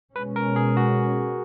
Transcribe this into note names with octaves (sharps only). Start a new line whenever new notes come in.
B2 G#3 C#4 B4
A#4
G#4
F#4